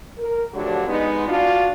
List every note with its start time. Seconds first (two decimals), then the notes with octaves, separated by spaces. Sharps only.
0.18 A#4
0.53 D3 F3 F#3 A3 D4 G4
0.87 G#3 B3 D#4
1.27 D4 F4 F#4